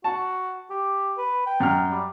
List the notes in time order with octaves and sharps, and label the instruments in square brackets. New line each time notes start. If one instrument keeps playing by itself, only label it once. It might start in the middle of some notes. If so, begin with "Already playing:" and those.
[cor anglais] F#4 [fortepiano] A5
[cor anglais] G4
B4
G5
[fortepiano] F#2 F6
[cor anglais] G3